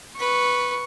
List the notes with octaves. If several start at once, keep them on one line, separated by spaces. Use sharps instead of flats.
B4 C#6